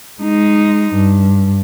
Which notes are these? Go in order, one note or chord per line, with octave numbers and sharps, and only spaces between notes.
G#3 D#4
G2